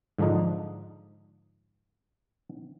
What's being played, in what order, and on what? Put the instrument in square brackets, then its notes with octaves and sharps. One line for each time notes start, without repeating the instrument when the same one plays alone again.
[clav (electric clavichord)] G#2 D3 F3 D4 D#4